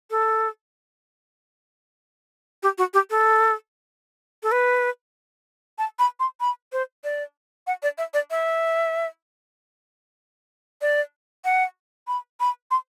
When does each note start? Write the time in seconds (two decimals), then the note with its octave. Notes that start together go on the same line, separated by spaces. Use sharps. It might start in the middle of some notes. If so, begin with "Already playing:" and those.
0.10 A4
2.63 G4
2.78 F#4
2.94 G4
3.10 A4
4.43 A4
4.52 B4
5.78 A5
5.99 B5
6.20 C6
6.40 B5
6.72 C5
7.04 D5
7.67 F#5
7.83 D5
7.98 E5
8.14 D5
8.31 E5
10.81 D5
11.45 F#5
12.07 B5
12.40 B5
12.71 C6